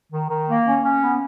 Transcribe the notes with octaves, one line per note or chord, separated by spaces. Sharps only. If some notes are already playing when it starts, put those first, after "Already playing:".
D#3
D#3
A#3
C#4
C#4
B3